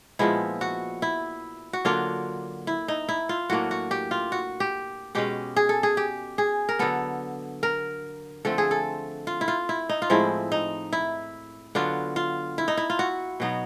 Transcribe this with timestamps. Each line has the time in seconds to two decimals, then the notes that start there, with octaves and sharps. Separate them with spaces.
0.19 A#2 F3 G#3 B3 E4
0.61 F#4
1.02 E4
1.73 F#4
1.85 D3 F#3 A#3 D4 F4
2.67 E4
2.88 D#4
3.09 E4
3.29 F4
3.50 A2 F#3 A#3 D4 F#4
3.71 F#4
3.91 G4
4.11 F4
4.32 F#4
4.60 G4
5.15 B2 G#3 C#4 G4
5.56 G#4
5.69 A4
5.83 G#4
5.97 G4
6.38 G#4
6.69 A#4
6.79 D3 F#3 B3 A4
7.63 A#4
8.45 D3 F3 A3 C4 A4
8.58 G#4
8.71 A4
9.27 F4
9.41 E4
9.48 F4
9.69 E4
9.89 D#4
10.02 F4
10.10 A2 F3 G#3 C4 E4
10.52 D#4
10.93 E4
11.75 D3 F#3 B3 D4 F4
12.16 F4
12.58 E4
12.68 D#4
12.77 E4
12.90 F4
12.99 F#4
13.40 B2 F#3 B3 D#4